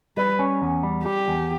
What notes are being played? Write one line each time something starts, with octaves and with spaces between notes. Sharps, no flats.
G3 B4
C#4
E2
G3
G3 G4
E2